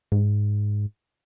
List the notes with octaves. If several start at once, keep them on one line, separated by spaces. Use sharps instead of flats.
G#2